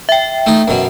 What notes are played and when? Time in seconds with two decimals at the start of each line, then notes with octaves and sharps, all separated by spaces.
0.09 E5 G5
0.46 A3 D#4
0.68 F#2 B2